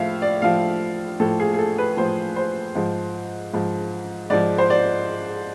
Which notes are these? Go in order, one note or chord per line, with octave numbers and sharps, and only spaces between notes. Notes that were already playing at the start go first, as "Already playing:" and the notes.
Already playing: A2 F3 E5 F5
D5
A2 F3 F5
A2 F3 A4
G#4
G#4
A4
B4
A2 F3 C5
C5
G#2 F3
G#2 F3
G#2 F3 D5
C5
D5